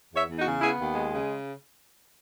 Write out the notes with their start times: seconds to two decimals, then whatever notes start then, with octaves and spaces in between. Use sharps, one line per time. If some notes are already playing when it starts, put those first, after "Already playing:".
0.10 E2
0.16 C#5 E5
0.28 E2
0.39 D#4 F#4
0.44 C#3
0.61 B3 E4 G#4
0.78 D#2
0.95 G#3
1.12 C#3